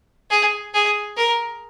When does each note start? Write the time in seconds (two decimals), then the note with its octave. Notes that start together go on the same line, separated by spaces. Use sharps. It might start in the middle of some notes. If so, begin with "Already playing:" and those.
0.31 G#4
0.74 G#4
1.17 A#4